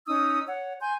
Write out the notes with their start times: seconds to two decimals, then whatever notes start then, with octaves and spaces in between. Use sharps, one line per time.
0.07 C#4 D#4 D#6 E6
0.46 C#5 F#5
0.80 G#5 C6 G6